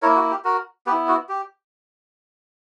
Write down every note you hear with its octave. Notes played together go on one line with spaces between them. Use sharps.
A#3 E4 A#4 C#5
F#4
G4
F#4 A#4
B3 E4 G4 B4
F#4
G4